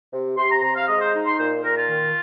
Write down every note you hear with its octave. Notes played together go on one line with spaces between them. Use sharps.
C3
C3 C6
A#5
C3 A#5
F5
G#3 D#5
C5
D#4
C6
A#2 C5
A#2 A#4
F4
D#3